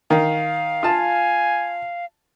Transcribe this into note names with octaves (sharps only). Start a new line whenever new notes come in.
D#3 F5
F4 G#5 A5